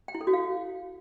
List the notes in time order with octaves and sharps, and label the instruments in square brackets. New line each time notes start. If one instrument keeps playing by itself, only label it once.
[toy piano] G5
E4
A4
F#4
F5